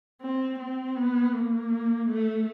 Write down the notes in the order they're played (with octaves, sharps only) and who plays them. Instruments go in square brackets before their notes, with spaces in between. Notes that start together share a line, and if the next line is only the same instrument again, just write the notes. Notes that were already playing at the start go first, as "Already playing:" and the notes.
[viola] C4
C4
B3
A#3
A3